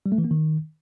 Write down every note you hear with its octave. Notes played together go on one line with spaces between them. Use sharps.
G3
A3
E3
A#3
D#3